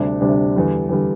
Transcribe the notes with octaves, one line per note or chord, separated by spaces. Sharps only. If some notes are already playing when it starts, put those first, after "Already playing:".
Already playing: D2 C3 G3 D4
D2 C3 G3 D4
E2 D3 G3
E2 D3 G3